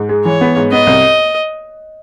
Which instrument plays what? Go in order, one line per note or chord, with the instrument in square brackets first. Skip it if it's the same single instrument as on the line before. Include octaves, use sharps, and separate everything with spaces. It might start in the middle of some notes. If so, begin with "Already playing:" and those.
Already playing: [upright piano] G#2
G#3
[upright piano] E3 [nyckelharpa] C#5
[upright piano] B3
G#2
[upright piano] B3 [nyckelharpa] D#5
[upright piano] C2